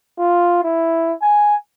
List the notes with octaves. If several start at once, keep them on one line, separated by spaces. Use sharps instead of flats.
F4
E4
G#5